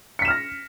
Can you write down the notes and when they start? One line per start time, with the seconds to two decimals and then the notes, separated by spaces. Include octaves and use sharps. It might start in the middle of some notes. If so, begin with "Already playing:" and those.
0.19 C#7
0.22 B6
0.25 E7
0.28 F6
0.31 A#6